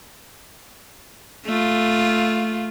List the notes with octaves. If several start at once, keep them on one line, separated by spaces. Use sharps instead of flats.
A3 F4